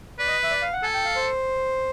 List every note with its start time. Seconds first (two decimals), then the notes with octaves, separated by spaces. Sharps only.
0.19 B4 D5
0.27 D#5
0.43 E5
0.51 D5
0.62 F5
0.73 F#5
0.83 A4 G#5
0.94 G5
1.05 F5
1.16 C5